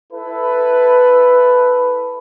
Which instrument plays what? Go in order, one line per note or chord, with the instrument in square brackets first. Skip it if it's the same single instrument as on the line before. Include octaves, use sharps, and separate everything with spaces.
[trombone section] E4 A4 B4